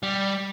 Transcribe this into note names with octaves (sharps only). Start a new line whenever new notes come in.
G3